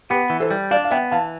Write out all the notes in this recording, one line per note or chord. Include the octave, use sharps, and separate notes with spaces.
B3 G4 B4
E3
A4 C5
G3
D4 D5 F5
F5
B3 E5 G5
E3 F5 A5